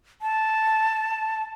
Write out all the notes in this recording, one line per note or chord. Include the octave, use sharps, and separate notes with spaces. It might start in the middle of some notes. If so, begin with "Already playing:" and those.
A5